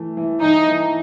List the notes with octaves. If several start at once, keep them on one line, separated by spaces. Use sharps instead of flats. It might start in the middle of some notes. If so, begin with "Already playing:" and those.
Already playing: E3 A3
E3
E3 D#4
E3